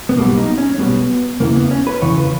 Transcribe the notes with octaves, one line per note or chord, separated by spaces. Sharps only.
B3
B1 B2 G3 A#3
D#4
C#4
B1 B2 G3 B3
E2 C#3 E3 A#3
B3
C#4
B4
E2 C#3 E3 C#5
B4